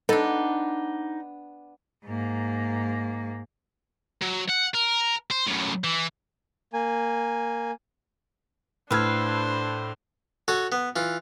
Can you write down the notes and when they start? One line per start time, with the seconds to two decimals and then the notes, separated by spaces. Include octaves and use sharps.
0.09 B3 D4 D#4 A4
2.06 G#2 A#3
4.22 F#3
4.50 F#5
4.75 A#4
5.31 C5
5.47 F#2 A2
5.84 E3
6.73 A#3 G#5
8.91 A2 D4 B4 C5 F5 E6 G#6
10.48 F#4 A4 C#5
10.72 B3
10.96 E3 F4